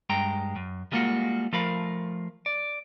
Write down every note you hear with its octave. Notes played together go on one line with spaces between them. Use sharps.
G2 G#3 G5 A#5
F#2
G3 G#3 A#3 F4 F#4
F3 A3 A#4 F5 B5
D5